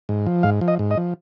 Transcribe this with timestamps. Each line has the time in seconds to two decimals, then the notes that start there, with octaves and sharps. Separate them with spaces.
0.09 G#2
0.26 F3
0.43 G#2 F5
0.61 F3
0.68 D#5
0.79 G#2
0.91 D#5
0.97 F3